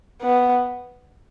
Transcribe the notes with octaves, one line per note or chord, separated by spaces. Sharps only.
B3